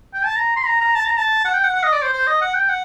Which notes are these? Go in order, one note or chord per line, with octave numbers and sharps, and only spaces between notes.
G5
A5
A#5
C6
A#5
A#5
A5
A#5
A5
F#5
G5
F#5
F#5
D#5
D5
C5
C5
D#5
F#5
G5
F#5